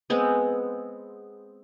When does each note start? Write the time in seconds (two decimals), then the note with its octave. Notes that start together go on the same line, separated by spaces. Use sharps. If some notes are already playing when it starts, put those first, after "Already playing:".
0.10 G#3 B3 C4